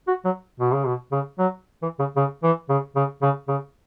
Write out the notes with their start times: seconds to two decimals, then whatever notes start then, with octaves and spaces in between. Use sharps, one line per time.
0.07 F#4
0.25 F#3
0.60 B2
0.73 C#3
0.86 B2
1.12 C#3
1.38 F#3
1.82 E3
1.99 C#3
2.16 C#3
2.43 E3
2.69 C#3
2.96 C#3
3.22 C#3
3.48 C#3